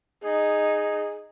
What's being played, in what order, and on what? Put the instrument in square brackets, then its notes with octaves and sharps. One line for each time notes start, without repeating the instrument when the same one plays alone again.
[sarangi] D#4 [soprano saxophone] G#4